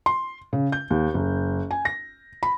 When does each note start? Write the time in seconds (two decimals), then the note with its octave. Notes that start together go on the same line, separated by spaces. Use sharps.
0.06 C6
0.53 C#3
0.72 G6
0.90 D#2
1.14 F#1
1.71 G#5
1.85 A#6
2.43 B5